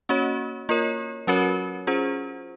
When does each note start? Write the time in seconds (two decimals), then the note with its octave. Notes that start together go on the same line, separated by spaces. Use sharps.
0.09 A#3 C#4 F#4 C#5
0.69 A#3 F4 A#4 C#5
1.27 F#3 C#4 F#4 A#4 C#5
1.87 C#4 F4 G#4 C5